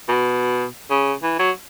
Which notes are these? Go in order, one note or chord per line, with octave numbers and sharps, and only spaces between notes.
B2
C#3
E3
F#3